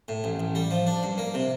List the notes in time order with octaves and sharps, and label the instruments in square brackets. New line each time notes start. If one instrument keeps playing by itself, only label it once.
[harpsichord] A2
A1
A1
G3
F3
D4
G2
A#3
C3